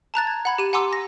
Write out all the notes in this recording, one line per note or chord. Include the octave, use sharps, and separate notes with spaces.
A5 A#5 F#6 A6
G#6
F#5 B5 G#6
G4 D#7
F#5 G#5 A#5 C6 D6 E6
A#6